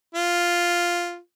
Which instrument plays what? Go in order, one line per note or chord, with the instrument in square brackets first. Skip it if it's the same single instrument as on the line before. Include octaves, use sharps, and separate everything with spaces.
[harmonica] F4